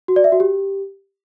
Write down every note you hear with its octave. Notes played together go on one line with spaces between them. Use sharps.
F#4
D5
E5
F#4
G4